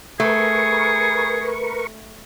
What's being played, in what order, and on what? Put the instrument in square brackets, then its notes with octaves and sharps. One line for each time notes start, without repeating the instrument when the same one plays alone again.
[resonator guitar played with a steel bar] A3 [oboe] G#4 [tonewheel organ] A#4 B4 C#6